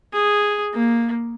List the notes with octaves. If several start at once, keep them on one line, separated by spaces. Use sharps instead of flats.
G#4
A#3